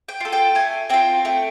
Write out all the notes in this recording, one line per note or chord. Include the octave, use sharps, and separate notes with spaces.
G5
F4 A4
G5
A3 G#5
C4 F4 G5
A3 G5